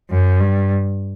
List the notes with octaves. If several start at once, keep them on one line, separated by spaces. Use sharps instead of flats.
F#2
G2